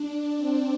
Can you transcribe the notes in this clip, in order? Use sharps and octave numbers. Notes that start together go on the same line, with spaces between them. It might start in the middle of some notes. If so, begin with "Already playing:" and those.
Already playing: D4
C4